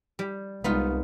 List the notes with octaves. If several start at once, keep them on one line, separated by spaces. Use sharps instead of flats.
G3
C2 G#3 B3 D#4 F4